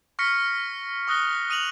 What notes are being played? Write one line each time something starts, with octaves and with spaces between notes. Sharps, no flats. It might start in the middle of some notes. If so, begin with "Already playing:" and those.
C#6 F6 A#6 B6 C#7
C#6 D#6 F#6 A#6 G7
D#6 D#7 F7 F#7